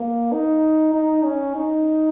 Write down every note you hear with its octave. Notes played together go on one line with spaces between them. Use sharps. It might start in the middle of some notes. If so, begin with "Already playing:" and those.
Already playing: A#3
D#4
D#4
C#4
D#4